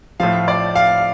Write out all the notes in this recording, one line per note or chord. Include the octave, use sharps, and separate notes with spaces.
A2 F3 F5
D5
F5